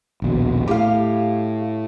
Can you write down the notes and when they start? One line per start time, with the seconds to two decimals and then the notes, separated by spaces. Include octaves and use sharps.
0.22 A#1 D#2 B2
0.68 A2 G4 F5